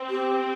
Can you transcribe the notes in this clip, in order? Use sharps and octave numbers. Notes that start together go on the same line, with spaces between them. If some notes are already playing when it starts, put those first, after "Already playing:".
Already playing: C4
G4